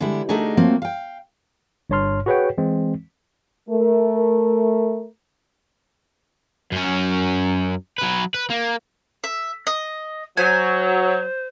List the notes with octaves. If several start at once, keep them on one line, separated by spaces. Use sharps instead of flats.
D3 G3 G#3 B3 E4
A3 D4 D#4 F#4 G#4 A#4
F3 F#3 A3 A#3 C4
F5 G5
G1 G2 C#5 A5 C6 F6
F#4 G#4 B4 C#5 F#5 G5
E3 G#3 C4
A3 A#4
F#2 C#4
F#3 B4
B4
A#3
E5
D#5
F#3 C5 G#5